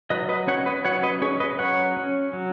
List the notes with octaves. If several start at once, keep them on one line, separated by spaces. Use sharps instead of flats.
F#3 B4 D#5
B4 D#5
C#4 C#5 F#5
B4 D#5
F#3 C#5 F#5
B4 D#5
C#4 G#4 C#5
B4 D#5
F#3 C#5 F#5
C#4
F#3